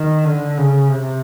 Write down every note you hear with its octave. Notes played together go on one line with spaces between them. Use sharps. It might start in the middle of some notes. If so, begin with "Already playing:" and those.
Already playing: D#3
D3
C#3
C3